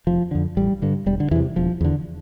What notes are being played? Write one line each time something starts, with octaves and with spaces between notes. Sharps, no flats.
F1 F3
F2 D3
A1 G3
G2 D3
E1 G3
D3
E2 C3 E3
E1 F3
E2 D3